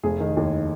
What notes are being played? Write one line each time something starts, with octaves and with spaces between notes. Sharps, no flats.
F1 G#4
D#3
D#2